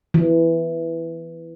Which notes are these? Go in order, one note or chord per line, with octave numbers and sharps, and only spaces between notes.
E3